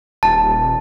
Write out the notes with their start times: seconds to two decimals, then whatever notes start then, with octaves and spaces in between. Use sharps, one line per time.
0.23 D#1 A5